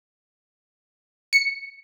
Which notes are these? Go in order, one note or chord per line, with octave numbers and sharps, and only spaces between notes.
C#7